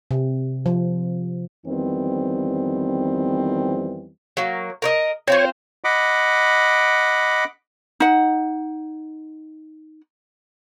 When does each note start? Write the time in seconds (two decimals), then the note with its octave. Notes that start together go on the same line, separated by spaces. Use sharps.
0.11 C3
0.66 F3
1.66 F2 D#3 E3 G3 B3 C4
4.37 F#3 A#3
4.82 A#4 C#5 D#5
5.28 C4 F4 C5 C#5
5.84 D#5 F#5 B5 D6
8.00 D#4 F#5